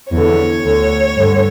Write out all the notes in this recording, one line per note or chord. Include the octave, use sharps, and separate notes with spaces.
E2 D3 C#5
D2 D3
G2 D3